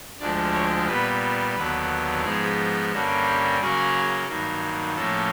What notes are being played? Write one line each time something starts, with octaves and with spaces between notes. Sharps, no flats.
D2 D3 F3 G#3 D5
C#5
A#2 G3 B3 B4
D#2 D3 F#3 B3 B4
G#2 F3 G#3 B3 G#4
G2 D3 G3 A#3 C#4 F#4
G4
C#3 F#3 A#3 C#4 G#4
G2 D#3 F#3 A#3
A2 F3 A#3 C#4 A4